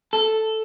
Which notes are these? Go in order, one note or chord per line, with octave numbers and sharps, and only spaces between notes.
A4